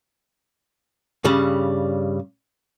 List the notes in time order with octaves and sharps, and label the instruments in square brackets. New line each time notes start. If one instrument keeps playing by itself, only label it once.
[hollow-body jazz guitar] G2 C#3 G3